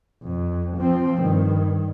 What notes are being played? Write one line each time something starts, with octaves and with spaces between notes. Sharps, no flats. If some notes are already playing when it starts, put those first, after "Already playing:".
F2
F3 C4
G2 D#3